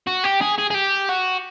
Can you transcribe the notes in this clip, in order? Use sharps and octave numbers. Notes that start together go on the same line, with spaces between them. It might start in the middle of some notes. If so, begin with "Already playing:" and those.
F#4
G4
G#4
G#4
G#4
G4
F#4